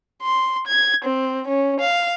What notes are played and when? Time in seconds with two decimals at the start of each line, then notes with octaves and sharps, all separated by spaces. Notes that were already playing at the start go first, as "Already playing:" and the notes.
0.22 C6
0.67 G#6
1.05 C4
1.47 C#4
1.80 F5